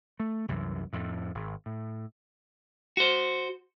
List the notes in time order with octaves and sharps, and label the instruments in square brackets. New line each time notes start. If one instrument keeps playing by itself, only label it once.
[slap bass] A3
C2 F#2 E3
F2 A2
G#1
A2
[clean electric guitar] F#4 C5